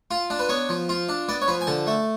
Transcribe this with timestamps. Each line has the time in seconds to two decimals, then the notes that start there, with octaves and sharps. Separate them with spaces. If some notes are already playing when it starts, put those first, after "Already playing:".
0.11 F4
0.30 D4
0.39 B4
0.49 B3 C#5
0.69 F3
0.89 F4
1.09 D4
1.29 B3 D5
1.42 C#5
1.48 F3 B4
1.61 G#5
1.67 D3 A5
1.87 A3